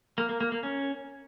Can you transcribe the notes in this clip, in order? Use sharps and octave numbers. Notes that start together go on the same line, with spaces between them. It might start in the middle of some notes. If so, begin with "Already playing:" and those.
A#3
A#3
A#3
A#3
C#4